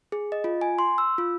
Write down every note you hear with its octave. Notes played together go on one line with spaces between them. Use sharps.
G#4
D#5
F4
G#5
C6
E6
F4